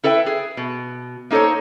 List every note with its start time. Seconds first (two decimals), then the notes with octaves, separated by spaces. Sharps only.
0.04 E4 A4 B4 E5 G5
0.26 G#4
0.57 B2
1.31 A#3 D#4 A4 C5 C#5